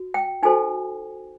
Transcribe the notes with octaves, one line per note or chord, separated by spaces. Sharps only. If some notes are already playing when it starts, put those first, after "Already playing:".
Already playing: F#4
G5
D#4 F#4 A4 C5 G#5